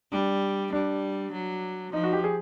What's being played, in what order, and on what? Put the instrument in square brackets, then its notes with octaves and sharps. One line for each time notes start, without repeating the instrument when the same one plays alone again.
[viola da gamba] G3 [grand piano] D4
[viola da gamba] G3 [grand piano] D4
[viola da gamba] F#3
[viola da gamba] F3 [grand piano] D#4
[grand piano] F#4
G4
G#4